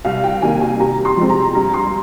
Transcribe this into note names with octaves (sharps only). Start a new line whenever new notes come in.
C2 F5
G5
C3 D#3 G3 A#3 G#5
G#5
C3 A#5
C6
F3 G#3 C4
A#5
G2 A#5
C6